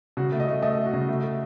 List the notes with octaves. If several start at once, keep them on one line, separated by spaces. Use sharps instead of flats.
C#3 F#4
A3
D#5
A3
A3 D#5
A3
F#4
C#3
A3
A3